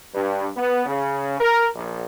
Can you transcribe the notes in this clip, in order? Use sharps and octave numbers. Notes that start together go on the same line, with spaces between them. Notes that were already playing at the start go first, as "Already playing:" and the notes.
G2
B3
C#3
A#4
A#1